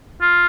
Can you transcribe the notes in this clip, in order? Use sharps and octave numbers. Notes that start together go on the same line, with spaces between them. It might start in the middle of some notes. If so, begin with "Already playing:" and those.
F4